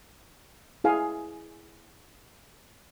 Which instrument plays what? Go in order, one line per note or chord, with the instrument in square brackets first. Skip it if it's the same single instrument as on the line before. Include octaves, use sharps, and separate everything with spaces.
[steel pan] E4 G#4 F5 G#5